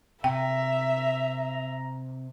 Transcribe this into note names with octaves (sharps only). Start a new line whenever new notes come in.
C3 E5 G5 A#5